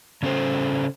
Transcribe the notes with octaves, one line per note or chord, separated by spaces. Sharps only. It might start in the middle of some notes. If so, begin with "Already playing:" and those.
C#3 C#4 A4 C5